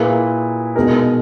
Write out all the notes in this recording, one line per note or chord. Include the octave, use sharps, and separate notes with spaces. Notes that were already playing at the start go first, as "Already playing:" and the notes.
Already playing: A#2 A#3 E4 G#4 B4
B2 G#3 D#4 A#4